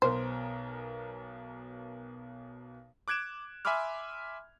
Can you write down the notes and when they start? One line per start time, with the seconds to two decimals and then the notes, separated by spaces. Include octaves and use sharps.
0.02 B1 B2 A#4 C5
3.08 D6 F#6 G#6 D7 E7
3.65 E5 G#5 B5 C6 D6 F6